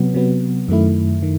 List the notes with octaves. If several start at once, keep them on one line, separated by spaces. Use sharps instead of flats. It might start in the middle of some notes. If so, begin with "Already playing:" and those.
Already playing: C3 F#3 B3
C3 F#3 B3
F#2 D#3 A3 E4
D#3